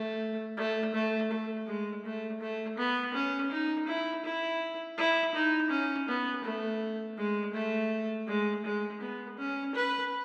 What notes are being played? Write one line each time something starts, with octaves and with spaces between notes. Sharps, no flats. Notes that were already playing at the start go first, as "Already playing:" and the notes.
Already playing: A3
A3
A3
A3
G#3
A3
A3
B3
C#4
D#4
E4
E4
E4
D#4
C#4
B3
A3
G#3
A3
G#3
G#3
B3
C#4
B4